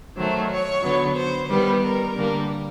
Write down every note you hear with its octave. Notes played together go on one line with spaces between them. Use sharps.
D#3 F#3 A3 C5
C#5
D3 F#3 B3
C5
D#3 G3 B3 B4
A#4
D3 G3 A#3